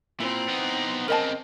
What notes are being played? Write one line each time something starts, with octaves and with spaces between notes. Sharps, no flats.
A#2 C4 E4
B3 D#4
C#3 C4 A#4 D#5 A5